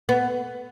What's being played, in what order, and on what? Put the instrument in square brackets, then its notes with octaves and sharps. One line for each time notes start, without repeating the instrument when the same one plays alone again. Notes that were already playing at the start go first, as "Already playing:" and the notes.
[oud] B3